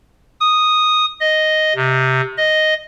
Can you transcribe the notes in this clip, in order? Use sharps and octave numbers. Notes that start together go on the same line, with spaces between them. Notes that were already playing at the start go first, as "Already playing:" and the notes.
D#6
D#5
C3
D#5